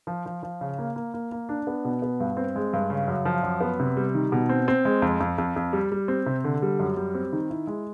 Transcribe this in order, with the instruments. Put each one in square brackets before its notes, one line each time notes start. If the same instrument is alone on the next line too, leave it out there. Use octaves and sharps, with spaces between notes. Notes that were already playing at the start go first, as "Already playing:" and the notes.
[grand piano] F3
F3
F3
C#3
A#3
A#3
A#3
A#3
D4
B3
B2
B3
G2
C4
G#3
G2
C#3
F#2
F3
F#2
B3
C3
G3
D#3
B2
C4
C4
G#3
F2
F2
F2
F2
G3
G3
C4
C3
D3
G3
F#2
G3
C4
D#3
E4
G#3